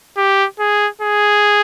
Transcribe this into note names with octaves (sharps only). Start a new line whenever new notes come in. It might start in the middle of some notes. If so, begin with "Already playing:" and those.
G4
G#4
G#4